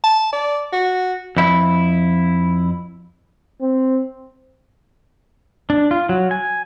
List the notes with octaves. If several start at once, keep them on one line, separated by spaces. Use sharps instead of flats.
A5
D5
F#4
F2 E4
C4
D4
F4
F#3
G#5